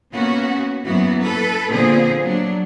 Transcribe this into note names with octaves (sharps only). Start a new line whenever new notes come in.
A#3 B3 C#4 F#4
F#2 E3 F#3 A#3 B3 F#4
A4 B4
A#2 D3 F3 B3 C4 G#4
F#3 D4